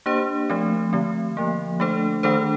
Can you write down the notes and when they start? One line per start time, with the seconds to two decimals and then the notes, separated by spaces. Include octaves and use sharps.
0.06 A#3 D4 G4 C5
0.50 F3 A3 C4
0.93 D3 A3 C4
1.37 D3 F3 A#3
1.80 A3 D4 A4 C5
2.23 D#3 A3 D4 A4 C5